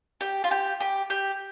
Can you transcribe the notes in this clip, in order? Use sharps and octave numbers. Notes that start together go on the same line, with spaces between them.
G4
F4
G4
G4
G4